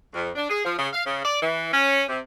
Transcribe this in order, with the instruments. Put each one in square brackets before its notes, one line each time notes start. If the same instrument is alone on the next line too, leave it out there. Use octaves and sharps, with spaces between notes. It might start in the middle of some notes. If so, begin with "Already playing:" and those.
[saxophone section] F2
D4
G#4
F3
C#3
F5
C#3
D5
E3
C#4
C3